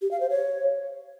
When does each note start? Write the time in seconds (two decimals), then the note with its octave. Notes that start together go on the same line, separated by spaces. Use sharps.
0.02 G4
0.11 F5
0.20 C5
0.30 C#5